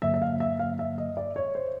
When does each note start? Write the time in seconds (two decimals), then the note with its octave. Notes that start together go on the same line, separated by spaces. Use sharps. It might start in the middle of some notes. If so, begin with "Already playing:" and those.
0.02 G2 D3 F#3 A#3 E5
0.14 E5
0.22 F5
0.40 E5
0.59 F5
0.79 E5
0.98 D#5
1.17 D5
1.36 C#5
1.55 C5